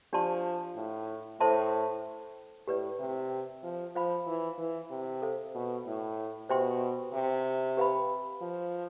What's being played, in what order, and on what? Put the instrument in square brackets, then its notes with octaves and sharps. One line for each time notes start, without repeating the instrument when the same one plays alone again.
[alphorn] F3 [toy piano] D4 G4 D5 A5 C6
[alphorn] A2
[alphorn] A2 [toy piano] A4 C5 E5 A5 C6
[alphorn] A2 [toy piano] G4 B4 D5
[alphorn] C3
F3
[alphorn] F3 [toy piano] C5 F5 B5
[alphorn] E3
E3
C3
[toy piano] A4 C5 F5
[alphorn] B2
A2
[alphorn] B2 [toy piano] G4 C5 E5 G5 C6
[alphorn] C3
[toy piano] G4 B4 F5 B5
[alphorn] F3